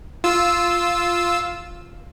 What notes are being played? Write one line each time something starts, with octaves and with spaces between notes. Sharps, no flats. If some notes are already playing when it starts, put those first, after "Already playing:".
F4 E6